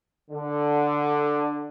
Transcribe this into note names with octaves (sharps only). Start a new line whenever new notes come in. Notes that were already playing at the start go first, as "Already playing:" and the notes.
D3